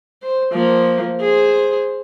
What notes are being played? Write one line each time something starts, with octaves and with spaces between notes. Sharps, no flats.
C5
F3 A#3
G#4 C5